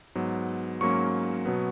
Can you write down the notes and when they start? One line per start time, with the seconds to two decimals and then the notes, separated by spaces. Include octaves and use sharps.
0.15 G#2 F#3 B3
0.81 G#2 F#3 A#3 C#4 C#6
1.45 B2 F#3 B3